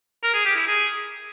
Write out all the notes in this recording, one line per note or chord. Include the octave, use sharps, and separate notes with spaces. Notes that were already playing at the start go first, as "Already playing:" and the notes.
A#4
G#4
G4
E4
G#4